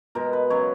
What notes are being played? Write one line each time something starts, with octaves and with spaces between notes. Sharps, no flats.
B2 G#3 A#4
B4
C#3 F#3 C#5